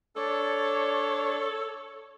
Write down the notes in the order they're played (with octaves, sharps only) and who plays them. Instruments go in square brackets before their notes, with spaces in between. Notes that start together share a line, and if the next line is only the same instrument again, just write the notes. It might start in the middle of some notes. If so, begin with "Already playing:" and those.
[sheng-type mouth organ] D4 D5 [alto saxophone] A4 [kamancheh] C#5